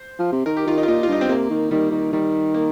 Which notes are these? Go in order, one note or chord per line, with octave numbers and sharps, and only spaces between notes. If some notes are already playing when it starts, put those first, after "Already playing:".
Already playing: C5
F3
C3
D#3 A#4
G4
D#3 F4
D#4
F4
A#2 D#4
F4
G2 D#4
C4
C3 A#3
D#3
D#3 G3
D#3
D#3 G3
A#3